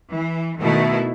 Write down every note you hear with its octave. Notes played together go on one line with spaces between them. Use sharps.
E3
B2 D#3 A3 E4